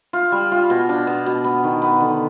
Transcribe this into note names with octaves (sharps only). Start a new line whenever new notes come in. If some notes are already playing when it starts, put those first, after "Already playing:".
F4
G3
F4
B2
D4
B2
B2
B3
D#3
B3
D3